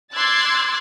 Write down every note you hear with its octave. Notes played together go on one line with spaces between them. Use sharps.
C6 D6 E6 F#6 G#6 A6